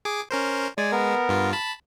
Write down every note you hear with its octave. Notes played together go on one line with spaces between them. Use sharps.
G#4 D6
C#4 A#4 C5
G#3 D5 G#5
B3 A#4
G2 F4
A5 B5